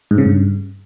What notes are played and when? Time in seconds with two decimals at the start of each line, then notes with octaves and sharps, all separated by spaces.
0.11 G#2
0.18 C#3
0.25 G2